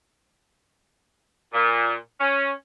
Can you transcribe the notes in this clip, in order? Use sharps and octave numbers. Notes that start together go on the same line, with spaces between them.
A#2
C#4